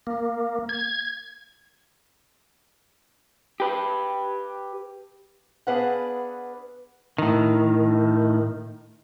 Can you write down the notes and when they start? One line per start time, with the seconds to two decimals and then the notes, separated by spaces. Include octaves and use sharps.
0.07 A#3
0.69 G#6
3.60 G4 B4
5.67 B3 D4 G#4 B4 F5 F#5
7.18 A2 D#3